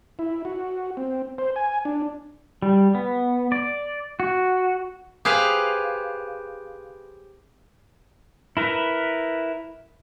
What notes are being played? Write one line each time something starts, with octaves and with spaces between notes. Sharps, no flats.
E4
F#4
C4
C5
G#5
D4
G3
B3
D5
F#4
G4 G#4 B4 C5 F5
E4 A#4 B4